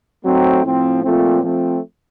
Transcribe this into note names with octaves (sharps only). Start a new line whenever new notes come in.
F#3 A3 C4 D#4
A2 F3 C4
A#2 F3 A3 C4
F3 A3 C4